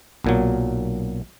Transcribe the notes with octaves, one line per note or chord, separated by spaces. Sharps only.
B1 A#2 F#3